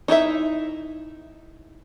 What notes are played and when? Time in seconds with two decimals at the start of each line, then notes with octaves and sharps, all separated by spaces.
0.08 D#4 E4 F#4 E5